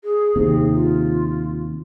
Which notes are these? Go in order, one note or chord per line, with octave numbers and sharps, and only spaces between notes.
G#4
D#2 C3
F4